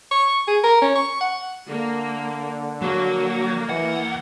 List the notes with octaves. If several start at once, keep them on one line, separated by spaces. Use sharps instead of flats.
C#6
G#4
A#4
C#4
C#6
F#5
D3 A#3
F#3 A#3
D#2 E3 F#5